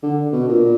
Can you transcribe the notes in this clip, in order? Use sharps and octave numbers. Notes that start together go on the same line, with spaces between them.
D3
B2
A#2